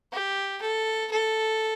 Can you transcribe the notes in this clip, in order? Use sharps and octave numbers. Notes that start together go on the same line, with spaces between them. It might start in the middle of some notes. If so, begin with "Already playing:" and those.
G4
A4
A4